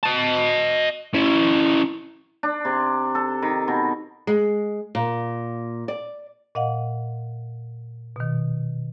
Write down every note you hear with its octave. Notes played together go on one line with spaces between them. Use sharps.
D#5 A5
C#4 E4
D4
C3
A4
D#3
B2
G#3
A#2
D5
A#2 D#5 F5 F#5
B2 D#3